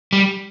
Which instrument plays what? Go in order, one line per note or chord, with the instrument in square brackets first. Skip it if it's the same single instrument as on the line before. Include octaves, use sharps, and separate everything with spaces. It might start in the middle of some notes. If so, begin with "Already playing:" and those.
[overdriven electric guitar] G3